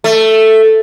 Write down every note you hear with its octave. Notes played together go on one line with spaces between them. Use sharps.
A3